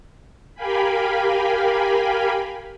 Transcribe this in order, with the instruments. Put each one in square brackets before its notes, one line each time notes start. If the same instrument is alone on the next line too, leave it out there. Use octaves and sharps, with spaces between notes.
[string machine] G4 A#4 F5 G5 G#5 B5